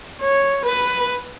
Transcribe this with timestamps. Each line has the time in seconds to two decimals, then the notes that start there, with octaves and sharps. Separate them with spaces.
0.21 C#5
0.65 B4